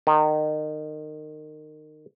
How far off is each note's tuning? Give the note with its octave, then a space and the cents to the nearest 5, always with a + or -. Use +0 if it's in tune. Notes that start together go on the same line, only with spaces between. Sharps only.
D#3 -25